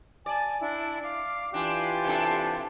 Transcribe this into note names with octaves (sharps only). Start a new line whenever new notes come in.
D5 G#5 A5
D4 E4
F5 D6
E3 D4 F4 G4 G#5 C6
C3 D4 A4